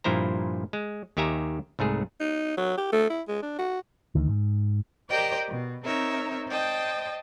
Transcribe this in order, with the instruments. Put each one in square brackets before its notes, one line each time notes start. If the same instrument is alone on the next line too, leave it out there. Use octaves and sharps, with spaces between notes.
[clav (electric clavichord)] G2 A#2 F3 E4 C5 A#5
G#3
D#2 D#3 G4 E5 G#5 A#5
C2 G#2 A3 G#4
[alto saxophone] D#4
F#3
G4
A3
E4
G#3
D4
F#4
[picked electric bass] D2 D#3
G#2
[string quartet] G4 A#4 C5 D5 D#5 G5
B2
C4 D#4 A#4 C#5 E5
C5 D5 D#5 G5 A5